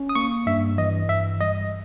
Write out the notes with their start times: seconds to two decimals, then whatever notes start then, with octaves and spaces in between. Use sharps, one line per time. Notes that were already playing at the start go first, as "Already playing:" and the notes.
Already playing: C#4
0.09 D#6
0.15 A#3 C#6
0.47 G2 E5
0.78 E3 D#5
1.09 G2 E5
1.41 G3 D#5